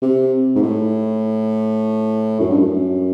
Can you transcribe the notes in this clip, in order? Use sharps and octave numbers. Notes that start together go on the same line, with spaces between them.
C3
G#2
A2
F#2
G2
F#2